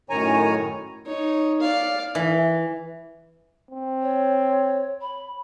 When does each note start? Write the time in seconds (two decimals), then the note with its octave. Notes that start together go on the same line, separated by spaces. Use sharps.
0.10 F#2 A2 D#3 C#5 G#5 A#5
1.06 D#4 C#5
1.61 D5 F5
2.15 E3
3.71 C4
4.02 C#5
5.01 B5